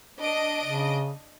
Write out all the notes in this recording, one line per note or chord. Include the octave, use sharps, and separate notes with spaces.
D4 D#5 D7
C#3